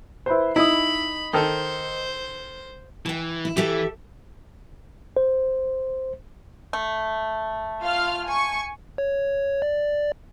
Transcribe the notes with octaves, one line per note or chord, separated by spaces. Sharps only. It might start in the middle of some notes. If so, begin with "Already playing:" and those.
E4 B4 C5
D#4 E4 B5 D#6
D#3 A4 C5
E3 G5 A5
E4
E3 G4 A4 E5
C5
A3
F4 F5 F6
G#5 C#6
C#5
D5